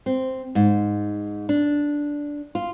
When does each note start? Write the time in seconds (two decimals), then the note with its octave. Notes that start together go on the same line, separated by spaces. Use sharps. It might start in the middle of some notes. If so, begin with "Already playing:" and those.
0.06 C4
0.55 G#2
1.49 D4
2.55 F4